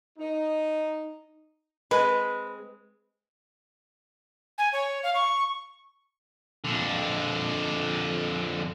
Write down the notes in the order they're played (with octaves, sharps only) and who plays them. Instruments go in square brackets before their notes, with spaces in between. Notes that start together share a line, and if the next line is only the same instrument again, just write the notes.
[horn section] D#4
[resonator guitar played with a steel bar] G#3 C4 [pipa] B4
[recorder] G#5
C#5
F5
C#6
[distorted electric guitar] F2 D3